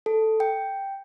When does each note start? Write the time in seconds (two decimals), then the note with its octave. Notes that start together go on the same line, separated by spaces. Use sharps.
0.06 A4
0.40 G5